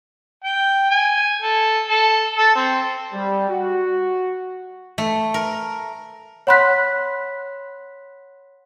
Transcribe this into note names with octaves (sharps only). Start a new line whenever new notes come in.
G5
G#5
A4
A4
A4
C4
G3
F#4
A3
A#4
C#5 F#5 B5 C6 F#6 B6